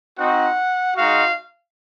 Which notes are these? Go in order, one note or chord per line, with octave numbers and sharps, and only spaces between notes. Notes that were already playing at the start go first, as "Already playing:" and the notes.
C4 D#4 F#4 F#5
G#3 D#4 F#4 F5